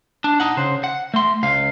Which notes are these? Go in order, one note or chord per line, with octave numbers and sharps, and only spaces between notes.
D4
D#4 F#5
C#3 C5
F#5
A3 C6
C#2 F5